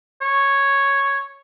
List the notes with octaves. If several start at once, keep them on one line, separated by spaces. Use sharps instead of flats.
C#5